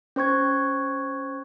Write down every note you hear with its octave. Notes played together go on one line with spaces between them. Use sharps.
C#4 C5 C#6 G#6